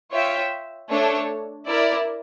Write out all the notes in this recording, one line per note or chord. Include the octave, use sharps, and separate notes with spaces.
F4 C#5 E5 G5
A3 D4 A4 C#5
E4 A#4 D5